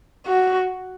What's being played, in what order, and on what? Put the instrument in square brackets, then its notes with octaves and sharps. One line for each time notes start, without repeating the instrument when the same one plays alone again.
[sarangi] F#4